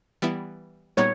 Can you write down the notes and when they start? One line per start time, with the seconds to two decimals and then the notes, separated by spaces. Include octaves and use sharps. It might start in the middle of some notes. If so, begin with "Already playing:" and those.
0.22 E3 G3 B3 E4
0.97 A#2 G3 B3 D#4 C#5